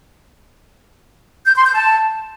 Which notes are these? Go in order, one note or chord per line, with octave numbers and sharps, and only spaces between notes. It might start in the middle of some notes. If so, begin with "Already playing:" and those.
G6
C6
G6
A5